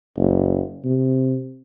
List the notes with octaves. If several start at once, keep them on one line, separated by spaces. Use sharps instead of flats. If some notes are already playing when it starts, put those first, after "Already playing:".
F#1
C3